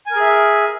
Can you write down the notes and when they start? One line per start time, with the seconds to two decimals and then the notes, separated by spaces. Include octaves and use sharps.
0.06 G#5
0.11 A#4
0.16 G#4
0.20 E5